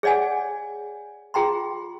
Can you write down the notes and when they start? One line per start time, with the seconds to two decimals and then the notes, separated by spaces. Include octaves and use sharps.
0.03 G#4 C#5 D5 F#5 G#5
1.34 F4 G#4 G5 A#5 C6